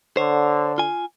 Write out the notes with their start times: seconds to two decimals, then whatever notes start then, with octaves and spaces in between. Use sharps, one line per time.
0.17 D3 C5 C#5
0.78 F4 G#5